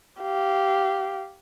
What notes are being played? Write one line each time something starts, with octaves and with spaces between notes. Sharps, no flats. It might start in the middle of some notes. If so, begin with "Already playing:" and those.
G4 F5